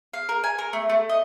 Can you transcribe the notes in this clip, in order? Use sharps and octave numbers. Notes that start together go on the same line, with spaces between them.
F5
A#4
G#5
A#4
A3
A3
D#5